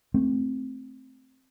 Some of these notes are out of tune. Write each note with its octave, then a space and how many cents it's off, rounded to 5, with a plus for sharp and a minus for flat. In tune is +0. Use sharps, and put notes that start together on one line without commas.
A3 -5 C4 +0